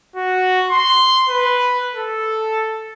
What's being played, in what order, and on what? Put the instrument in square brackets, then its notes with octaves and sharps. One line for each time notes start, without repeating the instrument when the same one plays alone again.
[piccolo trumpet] F#4
C6
B4
A4